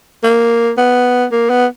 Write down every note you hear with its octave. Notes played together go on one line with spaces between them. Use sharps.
A#3
B3
A#3
B3